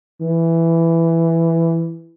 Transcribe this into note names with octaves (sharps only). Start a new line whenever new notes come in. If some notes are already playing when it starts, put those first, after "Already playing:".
E3